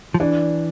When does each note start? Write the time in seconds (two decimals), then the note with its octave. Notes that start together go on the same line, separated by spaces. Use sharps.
0.14 F3
0.20 E3 D4